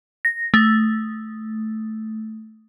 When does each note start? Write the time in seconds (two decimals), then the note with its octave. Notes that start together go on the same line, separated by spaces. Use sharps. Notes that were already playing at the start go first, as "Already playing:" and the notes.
0.25 A#6
0.54 A3